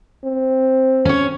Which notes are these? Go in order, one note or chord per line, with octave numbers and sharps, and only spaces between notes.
C4
C#4 C#5